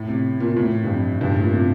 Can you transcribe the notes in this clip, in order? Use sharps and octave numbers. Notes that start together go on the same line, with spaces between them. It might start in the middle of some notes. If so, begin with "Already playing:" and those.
Already playing: A2
C3
A#2
A#2
A2
G2
F2
G2
A2
A#2
C3